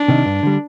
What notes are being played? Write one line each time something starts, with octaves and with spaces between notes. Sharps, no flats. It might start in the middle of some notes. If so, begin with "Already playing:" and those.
Already playing: D4
C3 D#3
G2
D3 G3